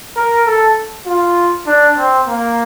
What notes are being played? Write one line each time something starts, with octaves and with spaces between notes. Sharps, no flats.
A#4
A4
F4
D4
C4
A#3